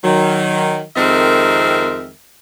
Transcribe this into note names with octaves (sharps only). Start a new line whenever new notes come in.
D#3 F#3
F2 D#3 G#3 C4 A#4 E5